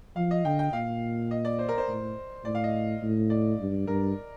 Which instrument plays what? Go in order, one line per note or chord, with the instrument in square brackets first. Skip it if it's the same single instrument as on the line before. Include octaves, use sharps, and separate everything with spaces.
[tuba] F3 [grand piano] F5
[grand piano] D#5
[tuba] D3 [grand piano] G5
[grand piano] G5
[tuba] A#2 [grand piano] F5
[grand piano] D#5
D5
C5
A#4
C5
[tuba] A2
[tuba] A2 [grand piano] D5
[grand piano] F5
D#5
[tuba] A2
[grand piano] D5
[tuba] G2
[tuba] G2 [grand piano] A#4